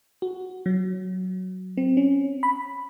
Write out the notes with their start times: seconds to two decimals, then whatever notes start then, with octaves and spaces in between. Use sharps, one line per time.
0.22 F#4
0.66 F#3
1.77 C4
1.97 C#4
2.43 B5